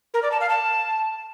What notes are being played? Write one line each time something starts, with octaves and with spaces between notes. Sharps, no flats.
A#4
D5
A5
F5
A5